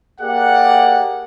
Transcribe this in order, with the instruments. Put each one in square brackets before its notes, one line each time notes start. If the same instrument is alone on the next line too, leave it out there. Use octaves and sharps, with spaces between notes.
[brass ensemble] A#3 G4 G#4 D5 F#5